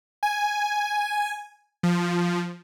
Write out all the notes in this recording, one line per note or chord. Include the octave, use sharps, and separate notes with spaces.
G#5
F3